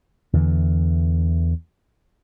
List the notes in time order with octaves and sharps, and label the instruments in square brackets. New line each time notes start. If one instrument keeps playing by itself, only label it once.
[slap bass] E2 D3 E3